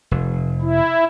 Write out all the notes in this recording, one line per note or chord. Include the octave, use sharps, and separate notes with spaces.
F1
E4